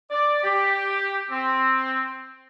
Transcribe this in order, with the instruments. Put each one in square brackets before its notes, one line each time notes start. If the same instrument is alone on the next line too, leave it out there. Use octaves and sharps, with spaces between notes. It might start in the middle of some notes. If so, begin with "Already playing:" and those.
[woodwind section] D5
G4
C4